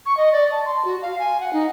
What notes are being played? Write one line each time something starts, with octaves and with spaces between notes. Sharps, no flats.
C#6
D#5
D5
A5
C6
F#4
F5
G#5
F#5
D#4